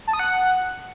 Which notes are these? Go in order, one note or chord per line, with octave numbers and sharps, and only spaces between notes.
A5
D#6
F#5